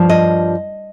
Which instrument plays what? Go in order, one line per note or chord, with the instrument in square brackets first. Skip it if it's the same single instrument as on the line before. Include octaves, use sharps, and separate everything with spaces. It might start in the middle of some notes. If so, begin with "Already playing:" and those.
Already playing: [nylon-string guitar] G2 F3
D#5